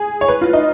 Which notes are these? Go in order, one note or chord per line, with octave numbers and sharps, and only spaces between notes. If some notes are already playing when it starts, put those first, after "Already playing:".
Already playing: G#4
C#5
B4
F4
D#4